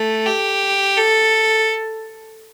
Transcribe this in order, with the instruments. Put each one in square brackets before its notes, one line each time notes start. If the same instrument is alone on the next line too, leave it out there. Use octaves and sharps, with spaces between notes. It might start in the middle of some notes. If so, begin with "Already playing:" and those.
Already playing: [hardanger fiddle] A3
G4
A4